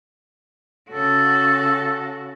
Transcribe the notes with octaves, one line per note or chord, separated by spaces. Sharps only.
C#3 F#4 A4